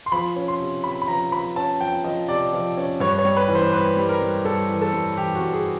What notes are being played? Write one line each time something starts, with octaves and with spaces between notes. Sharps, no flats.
C6
F3 B5
C#4
C6
C3
C3 B5
B5
F3 A#5
F3 B5
C#4 A5
F3 G5
F3 D#5
C3 D5
F3
C#4
G2 C#5
C#5
G3
B4
E3
C5
G3 B4
G3
A#4
G3
G2 A4
E3
A4
G2
E3 G4
F#4
G2
G#4